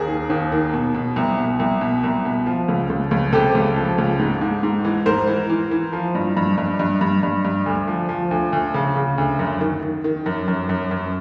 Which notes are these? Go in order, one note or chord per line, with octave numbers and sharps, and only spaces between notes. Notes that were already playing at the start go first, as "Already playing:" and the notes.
Already playing: D#2 G#4 A#4
D#3
D#2
D#3
B2
B2
C2
B2
C2
B2
C2
B2
F3
C#2
C#2
C#2
C3 G4 A4
C#2
F3
C#2
G#2
G#2
G#2
E3
G#2 A#4 C5
E3
E3
E3
F3
G2
G2
G2
G2
G2
G2
G2
D2
F3
F3
D2
D2
C#3
C#3
D2
F#2
D#3
D#3
D#3
F#2
F#2
F#2
F#2